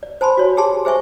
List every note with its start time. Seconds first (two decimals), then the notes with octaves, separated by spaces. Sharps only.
0.03 D5
0.21 C5 G#5 A5 B5 C6
0.37 F#4 C#5
0.57 G4 G#4 G#5 A5 C6
0.85 G#4 C5 E5 G#5 C#6